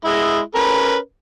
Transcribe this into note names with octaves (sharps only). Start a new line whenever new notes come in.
G#3 E4
C#4 A#4 B4